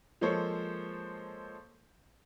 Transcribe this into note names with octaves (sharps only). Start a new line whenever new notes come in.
F3 G#3 A#3 A4 C5 C#5